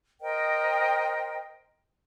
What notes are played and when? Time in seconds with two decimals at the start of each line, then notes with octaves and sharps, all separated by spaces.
0.20 A#4 C5 D#5 G5